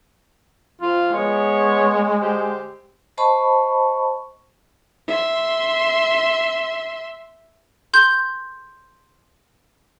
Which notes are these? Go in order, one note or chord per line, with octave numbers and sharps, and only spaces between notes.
F2 F4
G#3 B3 C#5
D3 C4 G4
C5 D#5 A5 B5 C#6
E5 C6
C6 G6